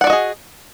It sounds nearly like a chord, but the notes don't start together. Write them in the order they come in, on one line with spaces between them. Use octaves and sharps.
F#5 D5 F#4 D#5 G#4